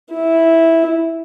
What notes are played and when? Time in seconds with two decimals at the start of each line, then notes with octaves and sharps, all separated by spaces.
0.13 E4